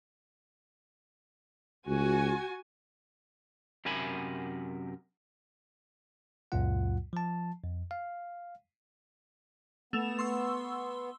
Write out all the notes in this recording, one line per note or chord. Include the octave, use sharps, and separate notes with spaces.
C#2 F#4 G#5
F#2 C3 A#4 E5 G#5 B5
C#2 F#2 A#2 F#3 F4 F#5
F3 A5
F2
F5
A3 B3 E7 F7
C6 C#6 E6